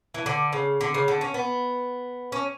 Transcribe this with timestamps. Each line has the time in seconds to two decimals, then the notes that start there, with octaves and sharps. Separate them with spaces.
0.14 E3
0.26 D3
0.53 C#3
0.81 D3
0.94 C#3
1.08 D3
1.21 C#4
1.34 B3
2.32 C#4